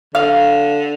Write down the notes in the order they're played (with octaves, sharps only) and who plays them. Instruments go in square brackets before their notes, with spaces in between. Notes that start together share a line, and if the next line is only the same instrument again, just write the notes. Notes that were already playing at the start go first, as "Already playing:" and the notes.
[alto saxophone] D3 [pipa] F5